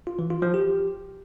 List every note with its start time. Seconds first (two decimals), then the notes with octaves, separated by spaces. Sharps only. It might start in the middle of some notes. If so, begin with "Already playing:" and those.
0.07 F4
0.19 E3
0.30 F4
0.42 F3
0.54 G4